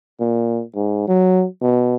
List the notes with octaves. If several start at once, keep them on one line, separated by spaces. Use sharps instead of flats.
A#2
G#2
F#3
B2